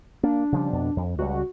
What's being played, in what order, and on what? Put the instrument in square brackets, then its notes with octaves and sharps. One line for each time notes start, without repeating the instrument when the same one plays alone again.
[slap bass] A#3 [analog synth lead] D4
[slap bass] C#3 F3 G3
F2 B2
F2
[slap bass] C#2 G3 [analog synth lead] F#4